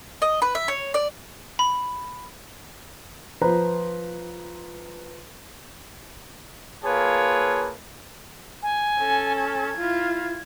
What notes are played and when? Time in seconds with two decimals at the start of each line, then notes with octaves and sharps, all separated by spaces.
0.22 D#5
0.42 B4
0.55 E5
0.68 C#5
0.94 D5
1.59 B5
3.42 F3 F4 B4 C5 A#5
6.84 A#3 F4 G#4 B4 C#5 A5
8.63 G#5
8.99 C#4 A4
9.37 G#6
9.77 E4 F4